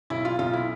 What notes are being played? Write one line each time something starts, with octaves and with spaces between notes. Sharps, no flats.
B1 E4
F4
B1 F4
E4